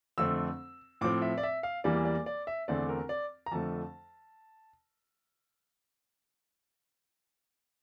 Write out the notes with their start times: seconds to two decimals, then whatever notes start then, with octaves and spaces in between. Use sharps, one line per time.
0.18 F2 D3 A3 C4 E6
1.01 A2 F3 C4 D6
1.22 E5
1.38 D5
1.43 E5
1.63 F5
1.84 E2 E3 G3 A#3 D5
2.05 D5
2.26 D5
2.47 E5
2.68 E2 D3 A3 C4 D5
2.89 A#4
3.09 D5
3.46 A#5
3.51 F2 D3 F3 A3 A5